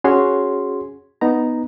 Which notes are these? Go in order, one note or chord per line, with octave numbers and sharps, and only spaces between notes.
C#4 F#4 G#4 C#5 C6
B3 D#4 A#5